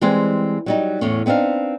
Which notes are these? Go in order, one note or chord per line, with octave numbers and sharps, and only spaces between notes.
E3 G3 G#3 C4 G#4
F#3 G3 D#4
E2 A2 C#4
B3 C4 D4 D#4 F5